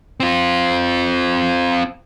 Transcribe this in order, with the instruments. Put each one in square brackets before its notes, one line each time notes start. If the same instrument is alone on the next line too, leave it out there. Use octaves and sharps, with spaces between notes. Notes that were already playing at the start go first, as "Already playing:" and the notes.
[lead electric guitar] C4 F4